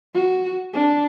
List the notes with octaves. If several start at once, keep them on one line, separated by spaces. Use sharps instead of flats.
F#4
D4